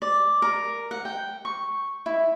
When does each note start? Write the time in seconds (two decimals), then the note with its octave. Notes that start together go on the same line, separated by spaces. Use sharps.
0.02 D5
0.42 A#4
0.91 F#5
1.05 G5
1.45 C#6
2.06 E4